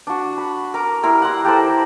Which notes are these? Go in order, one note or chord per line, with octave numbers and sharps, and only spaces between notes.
D4 F#4
B5
A#4 D6
G3 E4 A#4 C6
F#5 C6
G4 A4 A#4 C5